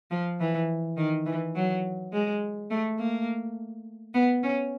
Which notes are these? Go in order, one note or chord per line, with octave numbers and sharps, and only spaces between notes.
F3
E3
D#3
E3
F#3
G#3
A3
A#3
B3
C#4